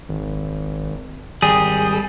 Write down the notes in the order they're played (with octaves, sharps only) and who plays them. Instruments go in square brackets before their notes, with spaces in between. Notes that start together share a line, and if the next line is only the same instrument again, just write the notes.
[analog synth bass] G#1
[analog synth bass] G#1 [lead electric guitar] G3 G#4